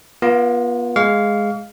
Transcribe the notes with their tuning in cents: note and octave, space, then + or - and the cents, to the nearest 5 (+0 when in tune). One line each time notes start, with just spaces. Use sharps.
B3 -35 F4 +0
G#3 +0 F5 +0 C#6 +45